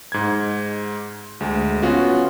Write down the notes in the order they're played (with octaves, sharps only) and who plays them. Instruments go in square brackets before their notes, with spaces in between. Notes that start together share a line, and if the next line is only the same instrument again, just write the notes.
[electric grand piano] G#2 G#6
D2 G#3
B3 C#4 F4 F#4